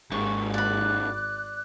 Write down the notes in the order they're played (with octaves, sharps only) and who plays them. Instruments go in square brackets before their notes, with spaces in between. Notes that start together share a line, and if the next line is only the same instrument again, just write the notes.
[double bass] G#1 [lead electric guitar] D#2 G#2 [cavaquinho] C#6
[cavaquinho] D5 B5 [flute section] F#6